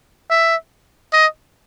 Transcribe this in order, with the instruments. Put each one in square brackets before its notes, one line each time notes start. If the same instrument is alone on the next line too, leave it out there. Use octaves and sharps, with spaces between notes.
[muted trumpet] E5
D#5